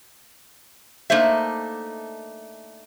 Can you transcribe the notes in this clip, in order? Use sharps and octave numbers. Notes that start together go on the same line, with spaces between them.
A3 A#3 D4 D#4 C5 E5